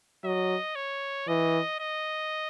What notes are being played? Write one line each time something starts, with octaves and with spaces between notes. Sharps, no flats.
F#3 D#5
C#5
E3 D#5
D#5